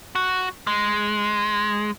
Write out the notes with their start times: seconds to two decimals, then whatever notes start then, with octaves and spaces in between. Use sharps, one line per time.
0.15 F#4
0.67 G#3